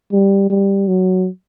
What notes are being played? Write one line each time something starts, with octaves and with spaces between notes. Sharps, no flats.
G3
G3
F#3